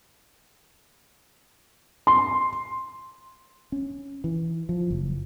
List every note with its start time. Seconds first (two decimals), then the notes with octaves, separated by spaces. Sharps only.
2.07 C6
3.72 C#4
4.24 E3
4.69 F3
4.91 F#1